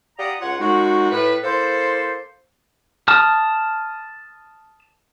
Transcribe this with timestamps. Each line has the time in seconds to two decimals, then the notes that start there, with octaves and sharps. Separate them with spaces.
0.19 G4 D5 F5 F#5 A#5 D#6
0.41 C#2 F4 C#5 F#5
0.60 F#2 G#3 D#4 F#4
1.12 A2 B4
1.43 A#3 E4 A4 C5
3.08 A5 D#6 F6